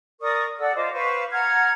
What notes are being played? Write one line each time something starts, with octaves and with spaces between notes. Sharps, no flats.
A#4 D5 C#6 D#6
A4 D5 F#5 E6
F4 C5 D#5 D6
B4 C5 F5 C#6
F#5 A#5 F6 G#6